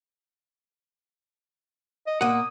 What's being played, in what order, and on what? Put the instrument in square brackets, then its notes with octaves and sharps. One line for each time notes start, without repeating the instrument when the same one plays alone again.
[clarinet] D#5
[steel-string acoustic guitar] A#2 A#3 [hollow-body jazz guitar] F#5 [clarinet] D#6